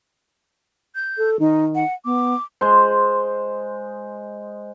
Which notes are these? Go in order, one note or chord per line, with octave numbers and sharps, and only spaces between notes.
G6
A4
D#3 D#4
F#5
B3 D6
G#3 C5